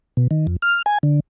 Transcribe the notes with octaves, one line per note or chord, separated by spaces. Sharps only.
B2
D#3
F2
F6
G#5
D3